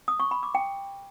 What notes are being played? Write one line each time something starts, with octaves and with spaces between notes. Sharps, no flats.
D#6
C#6
B5
D6
G5